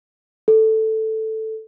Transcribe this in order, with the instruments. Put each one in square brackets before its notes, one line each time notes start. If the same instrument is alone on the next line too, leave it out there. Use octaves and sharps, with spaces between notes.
[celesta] A4